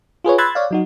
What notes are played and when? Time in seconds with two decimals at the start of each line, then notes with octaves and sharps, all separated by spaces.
0.24 F4 G#4 B4 C#5
0.38 B5 C6 E6 F#6 G#6 A6
0.55 C#5 D5 F5
0.71 F#3 D#4 F#4